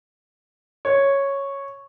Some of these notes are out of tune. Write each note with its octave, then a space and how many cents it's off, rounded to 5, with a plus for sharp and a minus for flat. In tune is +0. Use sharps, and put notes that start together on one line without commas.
C#5 -5